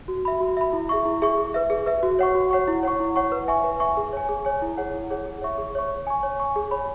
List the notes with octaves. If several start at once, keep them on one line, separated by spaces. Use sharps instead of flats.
F#4
E5 B5
F#4
E5 B5
E4
G#4 E5 C#6
E4
G#4 E5 C#6
G#4
B4 E5
G#4
B4 E5
F#4
C#5 F#5 C#6
F#4
C#5 F#5 C#6
E4
C#5 F#5 C#6
E4
C#5 F#5 C#6
B4
E5 G#5 C#6
B4
E5 G#5 C#6
G#4
C#5 G#5
G#4
C#5 G#5
E4
G#4 C#5 F#5
E4
G#4 C#5 F#5
G#4
C#5 E5 C#6
G#4
C#5 E5 C#6
C#5
G#5 C#6
C#5
G#5 C#6
G#4
C#5 G#5 B5